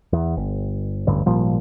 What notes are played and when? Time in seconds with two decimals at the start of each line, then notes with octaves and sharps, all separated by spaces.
0.13 E2
0.37 G1
1.07 D1 A1 G2 D3
1.26 G#1 A#2 F3 G3